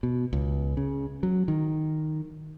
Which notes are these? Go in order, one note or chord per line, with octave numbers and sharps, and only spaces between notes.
B2
C#2
C#3
F#3
D#3